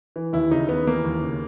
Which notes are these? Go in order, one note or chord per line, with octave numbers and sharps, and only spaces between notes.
E3
D#2 E4
C#3 D#4
D#2 B3
E3 A#3
D#2
C#3